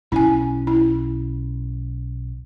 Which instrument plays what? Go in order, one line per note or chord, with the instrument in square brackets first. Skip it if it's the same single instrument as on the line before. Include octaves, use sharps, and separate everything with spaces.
[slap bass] B1 C#4 [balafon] E4 G#5
[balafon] E4